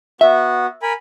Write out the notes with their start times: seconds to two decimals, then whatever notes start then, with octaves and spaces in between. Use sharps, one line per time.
0.21 B3 F#4 E5
0.82 A#4 G#5 B5